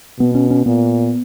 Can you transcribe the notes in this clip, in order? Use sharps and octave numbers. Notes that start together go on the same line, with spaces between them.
B2 B3
C#4
C#4
A#2 B3